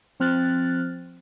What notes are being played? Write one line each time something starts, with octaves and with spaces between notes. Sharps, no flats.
F3 C4 F6 F#6 A6